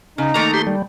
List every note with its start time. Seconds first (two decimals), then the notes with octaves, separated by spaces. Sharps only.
0.18 C#3 D#4
0.34 D#3 A3 A#3 A#5
0.54 G4 C6
0.67 G3